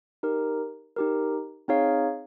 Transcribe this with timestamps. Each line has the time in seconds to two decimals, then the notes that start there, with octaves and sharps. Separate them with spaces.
0.23 D#4 G4 A#4
0.96 D#4 G4 A#4
1.68 C4 D#4 G#4 C#5 F5